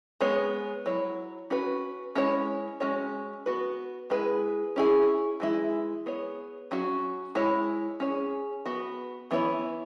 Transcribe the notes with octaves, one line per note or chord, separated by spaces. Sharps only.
G#3 B3 G#4 C#5
F#3 E4 C#5
C#4 F#4 B4
G#3 C#4 E4 C#5
G#3 C#4 F#4 C#5
B3 F#4 B4
G#3 E4 G#4 B4
C#4 E4 G#4
E3 G#3 E4
B3 G#4 C#5
F#3 C#4 F#4
G#3 E4 C#5
C#4 G#4 C#5
B3 F#4 B4
E3 B3 E4 C#5